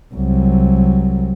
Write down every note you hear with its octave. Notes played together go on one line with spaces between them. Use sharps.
C2 F#3